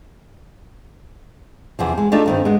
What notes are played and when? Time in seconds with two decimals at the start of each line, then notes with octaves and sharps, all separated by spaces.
1.79 E2 C3 F3
1.98 G#3
2.12 A3 D4 D#4 F4 A4
2.26 G2 D#3 C4
2.45 G#3 B3